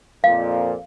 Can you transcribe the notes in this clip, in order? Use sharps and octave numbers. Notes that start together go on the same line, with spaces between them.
F2 A#2 F5